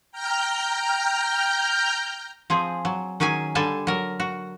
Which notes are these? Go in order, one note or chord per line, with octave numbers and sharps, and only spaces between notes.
G5 A#5 F6 G6
F3 C4 G#4
F#3
D#3 F#3 C#4 G#4 G#5
D3 G3 A4 G#5 A5
F#3 A#4
F#4